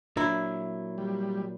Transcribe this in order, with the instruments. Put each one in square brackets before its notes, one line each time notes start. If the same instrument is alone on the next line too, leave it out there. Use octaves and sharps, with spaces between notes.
[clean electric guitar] A#2 F#3 [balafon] D4 [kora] E4
[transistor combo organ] G3